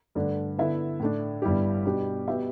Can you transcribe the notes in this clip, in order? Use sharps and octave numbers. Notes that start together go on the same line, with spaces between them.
G2 D3 A3 D4
D3 B3 E4 A4 E5
A2 A3 D4
G1 G2 G3 E4 G4
B2 G3 D4 G4
B2 B3 G4 E5